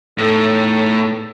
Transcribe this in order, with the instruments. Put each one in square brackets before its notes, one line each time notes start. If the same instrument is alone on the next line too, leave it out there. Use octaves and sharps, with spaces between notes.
[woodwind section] E2 D#4 A4 [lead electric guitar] A2